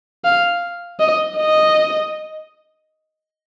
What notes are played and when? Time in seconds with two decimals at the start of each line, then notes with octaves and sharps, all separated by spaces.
0.25 F5
1.00 D#5
1.38 D#5